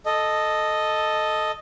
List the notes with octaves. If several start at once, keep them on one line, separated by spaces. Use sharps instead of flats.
A4 D#5